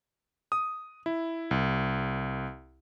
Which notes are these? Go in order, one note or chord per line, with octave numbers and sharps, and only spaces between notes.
D#6
E4
C2